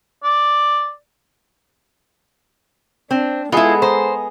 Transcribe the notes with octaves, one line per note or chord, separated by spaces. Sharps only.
D5
C4 D4
G#3 B3 E4 F4 G#4 A4 D#5
C5 A#5